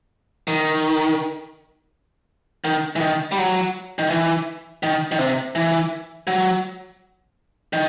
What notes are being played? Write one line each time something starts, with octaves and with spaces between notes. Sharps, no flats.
D#3
D#3
E3
D#3
G3
F#3
D#3
E3
D#3
D#3
C3
E3
F#3
D#3